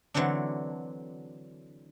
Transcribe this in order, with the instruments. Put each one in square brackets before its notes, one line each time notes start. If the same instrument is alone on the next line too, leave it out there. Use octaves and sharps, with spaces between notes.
[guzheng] D3 E3 F#3 C4 D4